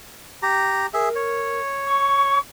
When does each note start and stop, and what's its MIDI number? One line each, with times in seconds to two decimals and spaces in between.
0.43 0.86 67
0.43 0.86 82
0.94 1.09 68
0.94 1.60 70
0.94 1.09 76
1.15 2.39 73
1.86 2.39 85